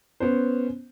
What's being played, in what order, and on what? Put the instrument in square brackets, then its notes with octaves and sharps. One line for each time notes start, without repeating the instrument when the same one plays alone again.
[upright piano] B3 C#4 C5